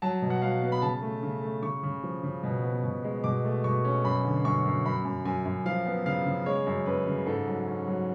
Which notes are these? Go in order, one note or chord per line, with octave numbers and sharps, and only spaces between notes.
F#3 A5
B2
F#5
F#3 F5
B3
B5
C#3 A5
A3
C#3
A3
C#3 C#6
C#3
F3
C#3
B2
B3
B2
G#3
B2 D6
A3
B2 C#6
C#4
F#2 B5
D3
F#2 C#6
F#2
F#2 B5
F#2
F#2 G#5
F#2
F3 F5
B3
C#3 F5
C#3
G#3 C#5
F#2
F#2 B4
C#3
G#2 A4
F#3
C#4
F#3